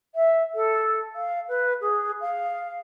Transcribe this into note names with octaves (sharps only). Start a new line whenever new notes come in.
E5
A4
F5
B4
G#4
F5